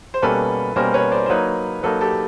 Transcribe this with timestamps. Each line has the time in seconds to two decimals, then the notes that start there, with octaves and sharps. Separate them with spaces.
0.14 C5
0.22 B2 G3 A#3 C#4 A4 B4
0.76 B2 G3 A#3 C#4 A#4 C5
0.94 B4 C#5
1.11 C5 D5
1.26 C5
1.29 F#3 A#3 D#4 B4 C#5
1.83 F#3 A#3 D#4 A4 B4
2.01 G4 A4